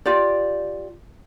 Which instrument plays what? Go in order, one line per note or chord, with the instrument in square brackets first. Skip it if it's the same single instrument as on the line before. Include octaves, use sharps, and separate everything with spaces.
[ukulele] F4 G4 D5